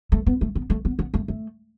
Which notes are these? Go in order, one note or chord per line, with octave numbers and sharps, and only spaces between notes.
A3
B3
A3
B3
A3
B3
B3
A3
A3